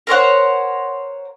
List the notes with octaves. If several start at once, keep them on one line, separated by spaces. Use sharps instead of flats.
A#4 C5 C#5 F#5